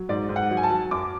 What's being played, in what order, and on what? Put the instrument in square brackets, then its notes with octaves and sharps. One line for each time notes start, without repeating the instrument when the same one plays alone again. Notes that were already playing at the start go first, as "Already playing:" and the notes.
Already playing: [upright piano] F#3
G#2 D5
G#2
F#5
F#3
G#5
A5
F#3
F#2 D6